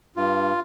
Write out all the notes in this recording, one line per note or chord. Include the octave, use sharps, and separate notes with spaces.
G2 F4